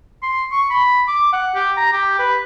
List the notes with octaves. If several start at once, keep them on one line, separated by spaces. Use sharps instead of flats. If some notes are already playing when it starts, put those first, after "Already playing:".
C6
C#6
B5
D6
F#5
G4
A#5
G4
B4